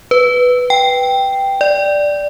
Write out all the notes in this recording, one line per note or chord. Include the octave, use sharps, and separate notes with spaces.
B4
G5
D5